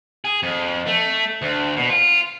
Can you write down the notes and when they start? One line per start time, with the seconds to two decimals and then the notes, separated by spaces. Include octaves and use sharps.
0.25 G#4
0.43 F2
0.87 A3
1.42 D2
1.77 B2
1.90 F4